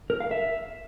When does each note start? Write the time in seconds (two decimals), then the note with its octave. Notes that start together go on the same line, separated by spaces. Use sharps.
0.10 A#4
0.20 F5
0.31 E5